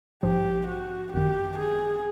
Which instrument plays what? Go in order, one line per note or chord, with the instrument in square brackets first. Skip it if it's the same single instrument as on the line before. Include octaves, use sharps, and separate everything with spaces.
[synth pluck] A#1 G#2 F3 [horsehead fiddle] G4
[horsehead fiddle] F#4
[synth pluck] G#1 F#2 D#3 [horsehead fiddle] G4
[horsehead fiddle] G#4